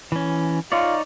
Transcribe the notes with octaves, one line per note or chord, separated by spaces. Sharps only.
E3 C#4
D#4 F4 C#5 D5